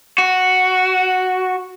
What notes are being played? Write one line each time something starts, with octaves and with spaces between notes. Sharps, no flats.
F#4